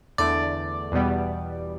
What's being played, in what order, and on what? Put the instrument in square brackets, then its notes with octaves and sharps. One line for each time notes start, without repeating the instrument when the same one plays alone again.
[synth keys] E2 D3 A3 D5
E2 B2 G3 B3